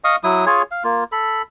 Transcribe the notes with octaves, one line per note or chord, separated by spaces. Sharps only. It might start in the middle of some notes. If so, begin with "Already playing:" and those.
D#5 F5 C#6 D#6
F#3 E4 D#6
F4 G#4 C#5 G#5
F5
A#3 F4
A4 B5